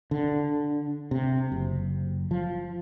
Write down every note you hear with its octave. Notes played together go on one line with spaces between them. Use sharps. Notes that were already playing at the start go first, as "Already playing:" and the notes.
D3
C3
F#1
F3